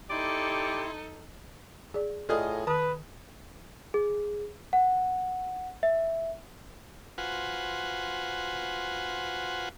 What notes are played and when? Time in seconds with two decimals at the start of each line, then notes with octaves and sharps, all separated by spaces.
0.10 D#4 E4 G4 A4 D5 C6
1.94 G#4 D5
2.29 A2 F4 G#4 A4 D5 D#5
2.67 D#3 B4 A5 D#6
3.94 G#4
4.73 F#5
5.83 E5
7.18 F4 F#4 B4 C5 F#5 G#5